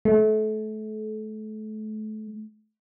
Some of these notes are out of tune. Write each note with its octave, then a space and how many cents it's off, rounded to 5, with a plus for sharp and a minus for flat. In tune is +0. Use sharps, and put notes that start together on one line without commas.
A3 -30